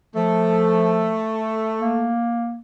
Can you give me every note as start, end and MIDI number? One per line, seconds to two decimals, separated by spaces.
0.16 1.21 53
0.16 2.14 57
1.81 2.60 58